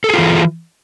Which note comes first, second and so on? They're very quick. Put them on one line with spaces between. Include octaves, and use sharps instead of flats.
A4 G#4 F4 E3